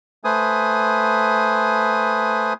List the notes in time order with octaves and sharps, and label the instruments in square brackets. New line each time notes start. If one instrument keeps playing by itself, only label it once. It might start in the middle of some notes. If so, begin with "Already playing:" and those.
[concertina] A3 B4 C5 G#5 D#6